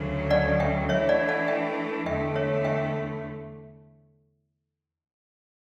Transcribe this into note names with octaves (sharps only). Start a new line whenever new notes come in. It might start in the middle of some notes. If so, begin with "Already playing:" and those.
Already playing: D2 C#3 F#3
D5 F#5
E5 G5
E3 A3 D4 C#5 E5
D5 F#5
D5 F#5
E5 G5
E2 D3 A3 E5 G5
C#5 E5
E5 G5